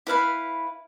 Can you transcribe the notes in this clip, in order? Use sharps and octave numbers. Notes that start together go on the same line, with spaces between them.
E4 B4 F5 B5